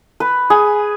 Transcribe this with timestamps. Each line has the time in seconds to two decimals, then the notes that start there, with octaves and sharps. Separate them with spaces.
0.20 B4
0.50 G#4